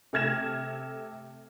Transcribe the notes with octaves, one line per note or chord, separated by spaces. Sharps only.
C3 A3 F6 G#6 A#6 E7